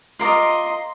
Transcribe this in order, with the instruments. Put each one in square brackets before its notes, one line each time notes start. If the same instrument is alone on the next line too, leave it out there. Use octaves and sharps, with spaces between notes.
[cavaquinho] F4 A#4 D6 [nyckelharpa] D#5 C6